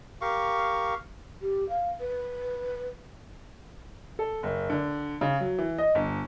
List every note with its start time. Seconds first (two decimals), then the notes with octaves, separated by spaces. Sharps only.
0.21 G4 A#4 F5 C#6
1.42 G4
1.69 F5
2.00 B4
4.19 A4
4.43 F#1
4.70 D3
5.21 C#3
5.40 F#3
5.58 E3
5.78 D#5
5.95 G1